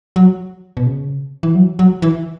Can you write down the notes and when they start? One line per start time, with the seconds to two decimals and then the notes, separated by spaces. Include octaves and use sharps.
0.16 F#3
0.77 B2
0.86 C#3
1.43 E3
1.55 F#3
1.79 F#3
2.02 E3